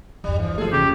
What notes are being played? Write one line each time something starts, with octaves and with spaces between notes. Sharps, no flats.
G1 E2 G3
E3 F3
F3 A3 G#4 A4
C#3 G4